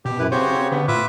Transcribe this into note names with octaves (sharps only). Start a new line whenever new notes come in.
B2 G4
F#2 E4 B4
C#3 C4 F#4 G4 C5 C#5
D3 B3
A2 F4 B4 E5 D6